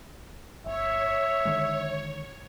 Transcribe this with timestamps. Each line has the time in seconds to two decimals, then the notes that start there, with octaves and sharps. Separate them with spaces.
0.66 G1 C#5 E5
1.45 D3 D#3 G#3